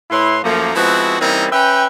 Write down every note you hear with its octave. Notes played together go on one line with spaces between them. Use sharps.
A2 E4 B4 C#5 C6
F#2 F3 A3 A#3
F3 G#3 B3 C4 E4 F#4
E3 G3 A#3 C4 C#4 D#4
C#4 B4 E5 G5